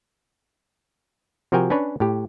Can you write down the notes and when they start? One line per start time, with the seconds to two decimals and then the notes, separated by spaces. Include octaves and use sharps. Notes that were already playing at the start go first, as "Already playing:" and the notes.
1.52 C3 F3 F#4 A#4 G5 G#5
1.70 C#4 D4 B4 C#5
2.00 A2 G4